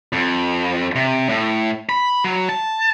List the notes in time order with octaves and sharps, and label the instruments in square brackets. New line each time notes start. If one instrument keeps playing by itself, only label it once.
[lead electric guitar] F2
C3
A2
B5
F#3
A5